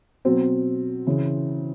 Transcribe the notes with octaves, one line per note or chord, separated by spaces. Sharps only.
B2 F#3 C4
C#3 E3